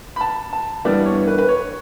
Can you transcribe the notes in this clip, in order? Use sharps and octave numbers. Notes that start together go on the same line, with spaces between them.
B5
A5
A5
G2 E3 G3 B3 D4 D5
C#5
B4
B4
C#5